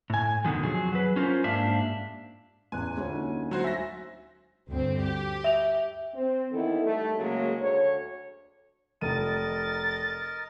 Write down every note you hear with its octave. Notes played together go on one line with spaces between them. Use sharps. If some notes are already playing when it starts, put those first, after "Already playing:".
A2 G#5
E2 B2 D3 D#3 F3
F2 F#3 G#4
F#3 B4
C#4 F4 A#4 C5
G#2 A#3 D4 G4 E5 F5
A1 E2 G#5 C6 F#6
D2 F4 C#5
A#3 C#4 D#4
F#3 F#4 C5
E5 G#5 A#6
D2 G2 C4
G4
E5 F7
C4
D#3 E3 B3 E4 A4
D#3 G3 A3
C#3 F#3 G#3 A#3
D2 C#5
F1 A#4 D#5 A6 D#7